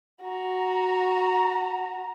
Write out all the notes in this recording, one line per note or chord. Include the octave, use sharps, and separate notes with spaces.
F#4 A#5